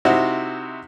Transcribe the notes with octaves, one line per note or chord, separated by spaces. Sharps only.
C3 D#4 E4 F#4 C5